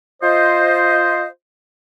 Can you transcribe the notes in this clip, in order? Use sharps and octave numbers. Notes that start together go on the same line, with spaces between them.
F4 C5 D#5